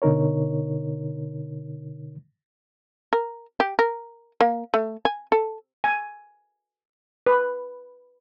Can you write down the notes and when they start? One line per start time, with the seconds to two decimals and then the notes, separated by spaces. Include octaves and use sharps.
0.02 B2 D3 D#4 A#4 C#5
3.13 A#4
3.60 G4
3.79 A#4
4.41 A#3
4.74 A3
5.05 G#5
5.32 A4
5.84 G#5
7.26 B4